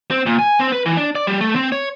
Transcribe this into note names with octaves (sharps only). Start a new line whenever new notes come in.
C4
A#2
G#5
C4
B4
E3
D4
D5
G3
A3
C4
C#5